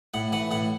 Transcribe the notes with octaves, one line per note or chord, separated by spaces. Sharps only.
A2 F#5
E3 F#5
A2 F#5